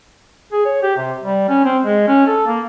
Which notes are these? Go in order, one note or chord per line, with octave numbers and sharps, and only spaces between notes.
G#4
C#5
G4
C3
G3
C#4
C4
G#3
C#4
A4
A#3